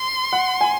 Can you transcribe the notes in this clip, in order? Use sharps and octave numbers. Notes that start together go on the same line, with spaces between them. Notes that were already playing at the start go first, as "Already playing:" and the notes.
Already playing: C6
F#5
G#5